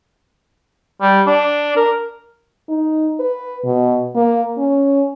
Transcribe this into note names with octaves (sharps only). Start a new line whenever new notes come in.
G3
D4
A#4
D#4
B4
B2
A#3
C#4